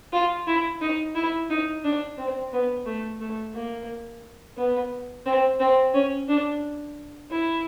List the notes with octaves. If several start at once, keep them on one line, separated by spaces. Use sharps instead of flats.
F4
E4
D#4
E4
D#4
D4
C4
B3
A3
A3
A#3
B3
C4
C4
C#4
D4
E4